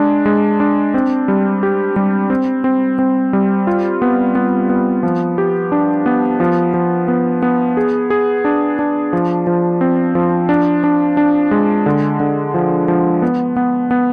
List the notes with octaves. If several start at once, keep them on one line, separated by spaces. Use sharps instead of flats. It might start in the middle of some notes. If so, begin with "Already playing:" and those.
Already playing: G#3 D4
G#3
D4
C4
G3
G4
G3
C4
C4
C4
G3
F4
B3
B3
B3
F3
G4
D4
B3
F3
F3
B3
B3
G#4
G#4
D4
D4
F3
F3
C4
F3
D4
D4
D4
G#3
D3
D3
F3
F3
B3
B3
B3